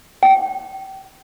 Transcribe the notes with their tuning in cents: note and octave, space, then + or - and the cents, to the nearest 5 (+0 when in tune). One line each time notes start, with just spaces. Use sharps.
G5 -30